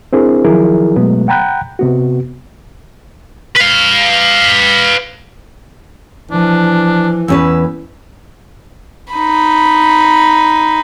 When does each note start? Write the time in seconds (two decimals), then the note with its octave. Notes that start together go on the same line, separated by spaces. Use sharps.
0.13 C4 D4 E4 G#4 A#4 C5
0.44 D#3 F3 F#3 E4 G#4 A#4
0.96 B2 F#3 G#3 A3 B3
1.28 F#5 G5 A#5 B5 F#6 G6
1.79 C3 B3 F#4
3.56 B4 F5
6.31 E3 F3 D4
7.28 E2 C#4 B4 E6
9.14 D#4 B5